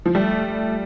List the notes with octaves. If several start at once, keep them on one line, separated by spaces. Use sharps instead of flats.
F3
G3 A3